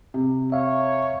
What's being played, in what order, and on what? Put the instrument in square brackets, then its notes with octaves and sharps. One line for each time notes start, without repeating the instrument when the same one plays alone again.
[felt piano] C3
[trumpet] C#5 [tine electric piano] E5 F5